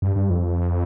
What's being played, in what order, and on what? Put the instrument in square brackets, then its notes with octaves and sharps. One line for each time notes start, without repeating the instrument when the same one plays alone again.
[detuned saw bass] G2
G2
F2